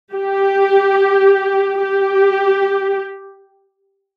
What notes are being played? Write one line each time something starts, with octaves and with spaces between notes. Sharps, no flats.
G4
G4